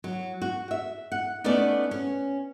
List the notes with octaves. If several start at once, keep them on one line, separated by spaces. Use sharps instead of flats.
F#3
F#4
E5
F#5
A3 B3 C#4 D#4 B4 D5
C#4